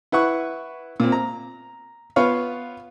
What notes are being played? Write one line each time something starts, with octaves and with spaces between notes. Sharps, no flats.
E4 B4 F#5 C#6
A#2 C4
A#5
B3 F4 B4 C#5 F5